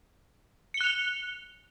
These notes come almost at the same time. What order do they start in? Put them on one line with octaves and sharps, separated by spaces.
C#7 G7 F#6 F7